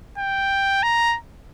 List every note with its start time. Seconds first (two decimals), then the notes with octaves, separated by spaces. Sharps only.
0.18 G5
0.83 A#5